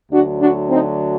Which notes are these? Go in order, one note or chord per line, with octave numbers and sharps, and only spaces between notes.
D2 D3 F#3 D4 F#4
D4 F#4
C4 D#4